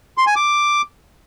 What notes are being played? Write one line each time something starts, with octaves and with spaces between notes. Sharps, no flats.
C6
G#5
D6